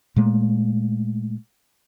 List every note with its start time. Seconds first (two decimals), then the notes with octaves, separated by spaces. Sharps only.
0.16 A#2 G#3 A3